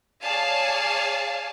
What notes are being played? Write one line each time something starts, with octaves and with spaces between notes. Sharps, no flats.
G#4 C#5 D5 F5 G#5 A5